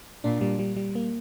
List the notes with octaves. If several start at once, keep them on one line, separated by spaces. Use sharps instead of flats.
A#2 D4
G3
G3
G3
A#3